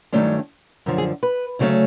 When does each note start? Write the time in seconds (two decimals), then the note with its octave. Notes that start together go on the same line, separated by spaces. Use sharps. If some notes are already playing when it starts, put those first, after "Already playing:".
0.13 G2 D#3 F#3 A3 C#4 D4
0.86 F#2 D3 F3
0.98 G#4
1.23 B4
1.59 D2 C#3 F#3 A3 C#4